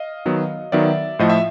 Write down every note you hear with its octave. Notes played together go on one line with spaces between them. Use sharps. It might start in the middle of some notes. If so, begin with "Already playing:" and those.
Already playing: D#5 F5
D#3 F#3 B3
D#3 F#3 B3 D5 E5
A2 F3 A3 D#5
E5